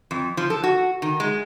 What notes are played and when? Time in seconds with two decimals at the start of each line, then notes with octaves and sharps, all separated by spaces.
0.11 F2
0.37 F3
0.50 A4
0.64 F#4
1.02 D#3
1.20 G#3